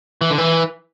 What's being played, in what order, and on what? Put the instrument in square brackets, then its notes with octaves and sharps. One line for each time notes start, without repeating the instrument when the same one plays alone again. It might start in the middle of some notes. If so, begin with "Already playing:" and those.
[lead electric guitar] E3
D3
E3